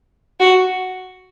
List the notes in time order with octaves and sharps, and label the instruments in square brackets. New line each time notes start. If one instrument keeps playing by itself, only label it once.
[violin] F#4